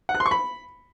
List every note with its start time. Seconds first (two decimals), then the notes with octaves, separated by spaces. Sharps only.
0.09 F#5
0.15 F#6
0.20 C6
0.26 C#6
0.31 B5